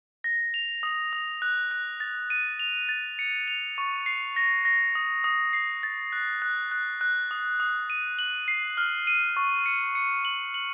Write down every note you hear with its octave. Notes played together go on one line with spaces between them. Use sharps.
A#6
F7
D#6
D#6
F#6
F#6
A6
D#7
F7
A6
C#7
F7
C#6
C7
A#6
A#6
D#6
D#6
C7
A6
F#6
F#6
F#6
F#6
D#6
D#6
D#7
F#7
C7
F6
D#7
C#6
C#7
C#7
F#7
F#7